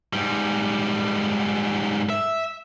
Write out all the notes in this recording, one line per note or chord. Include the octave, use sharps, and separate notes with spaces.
G#2 G3
E5